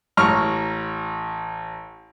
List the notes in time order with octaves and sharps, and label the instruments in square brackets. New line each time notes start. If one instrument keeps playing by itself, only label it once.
[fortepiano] A1 A#5 C#6 F6